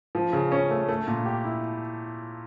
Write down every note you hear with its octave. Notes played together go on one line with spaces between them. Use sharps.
F3
C#3
C#4
A3
A3
A#2
G4
E4